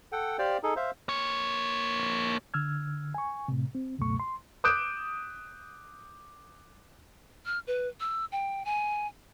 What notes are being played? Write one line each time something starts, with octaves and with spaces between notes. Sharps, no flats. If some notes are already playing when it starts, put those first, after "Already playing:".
A4 F#5 G5
G4 C5 D5 F5 G5
D#4 G#4 A4
C5 E5 F5
A#3 C#5
D3 E6 F6 G#6
G#5 C#6
A2 C3
C4
C#2 F#2 B2 A3 C#6
C6
D6 D#6 F#6 G6 D7 E7
F6
B4
E6
G5
G#5